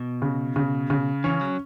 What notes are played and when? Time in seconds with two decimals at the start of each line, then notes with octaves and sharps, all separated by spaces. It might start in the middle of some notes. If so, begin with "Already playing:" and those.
Already playing: B2
0.22 C#3
0.56 C#3
0.90 C#3
1.24 E3 C#4
1.41 F#3